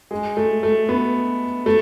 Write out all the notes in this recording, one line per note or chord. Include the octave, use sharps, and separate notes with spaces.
G#3
A3
A3
B3
A3